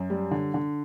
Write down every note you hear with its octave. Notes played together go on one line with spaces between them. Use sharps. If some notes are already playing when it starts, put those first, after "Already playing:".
Already playing: F#2
G3
D3
D3